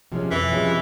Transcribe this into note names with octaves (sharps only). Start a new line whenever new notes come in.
C3 F3 G#3 C#4
F2 E3
C3 F3 G#3 C#4